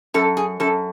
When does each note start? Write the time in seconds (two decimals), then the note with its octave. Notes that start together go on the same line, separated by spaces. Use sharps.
0.14 F#2 A4
0.37 G#4
0.60 F#2 A4